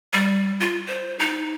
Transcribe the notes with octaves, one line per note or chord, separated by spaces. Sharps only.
G3
F4
C5
D#4